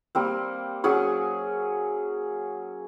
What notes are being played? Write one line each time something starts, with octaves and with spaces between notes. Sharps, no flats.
G3 A#3 C4
F#3 C#4 G#4 C#6